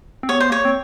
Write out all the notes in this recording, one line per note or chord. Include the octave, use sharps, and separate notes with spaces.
C4
B3 C#5
C5
A#3 C#5
C4